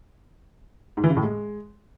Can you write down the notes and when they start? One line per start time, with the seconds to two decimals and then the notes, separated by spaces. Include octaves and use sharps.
0.97 G#2
1.04 E3
1.10 C#3
1.17 A2
1.23 G#3